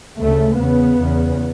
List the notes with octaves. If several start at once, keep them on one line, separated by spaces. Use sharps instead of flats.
D2 C#3 A3
E2 C#3 B3
E2 C#3